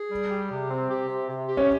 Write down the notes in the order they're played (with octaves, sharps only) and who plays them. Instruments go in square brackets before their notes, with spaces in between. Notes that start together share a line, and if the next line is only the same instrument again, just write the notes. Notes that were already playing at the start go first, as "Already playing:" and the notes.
Already playing: [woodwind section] G#4
G3
G4
C3
C4
G4
C3
C3
G4
[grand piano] C#4